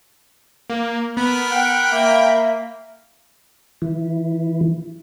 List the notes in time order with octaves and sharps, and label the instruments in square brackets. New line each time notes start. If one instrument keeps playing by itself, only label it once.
[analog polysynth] A#3
[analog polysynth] B3 [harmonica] A#4 B5
[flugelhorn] F#5 [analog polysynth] G5
[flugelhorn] A#3 [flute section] E5 F5
[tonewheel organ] E3